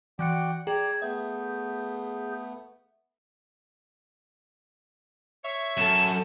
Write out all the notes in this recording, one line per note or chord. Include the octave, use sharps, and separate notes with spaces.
E3 F#4 D5 G5 F#6 C#7
G#4 D5 G5 A#5 G#6
A3 B3 G#4 E5 G6
C#5 E5
F#2 A4 E7